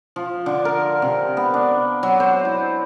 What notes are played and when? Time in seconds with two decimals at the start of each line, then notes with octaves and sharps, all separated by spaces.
0.16 F3
0.46 D3
0.65 A#4
1.02 C3
1.37 B3
1.54 D4
2.03 F#3
2.20 C5
2.45 E4